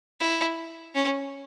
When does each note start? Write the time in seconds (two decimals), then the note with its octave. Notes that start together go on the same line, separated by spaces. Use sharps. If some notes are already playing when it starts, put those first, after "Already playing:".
0.20 E4
0.95 C#4